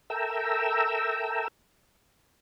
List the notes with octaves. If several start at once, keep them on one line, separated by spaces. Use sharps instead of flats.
A4 A#4 E5 G5 A#5 E6